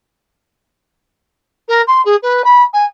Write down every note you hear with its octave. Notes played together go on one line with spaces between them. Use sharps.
A#4
C6
G#4
B4
B5
G#5